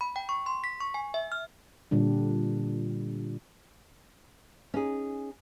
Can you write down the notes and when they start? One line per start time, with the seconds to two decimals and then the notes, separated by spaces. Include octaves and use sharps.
0.01 B5
0.16 G5
0.29 C#6
0.46 C6
0.64 B6
0.81 C#6
0.94 G#5
1.14 E5
1.32 F6
1.91 A#2 D3 G3 D4
4.74 C#4 D#4 G#4